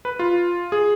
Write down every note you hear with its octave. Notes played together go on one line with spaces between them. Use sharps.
B4
F4
G#4